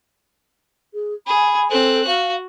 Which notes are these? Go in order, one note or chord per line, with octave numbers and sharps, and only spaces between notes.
G#4
G#4 B5
C4 A4 F#6
F#4 F5